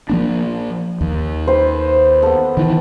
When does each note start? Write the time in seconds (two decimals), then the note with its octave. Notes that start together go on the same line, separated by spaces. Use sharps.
0.09 F3 A#3 D4
1.01 D#2
1.47 B4 C5 G5
2.23 B3 A4
2.57 D#3 E3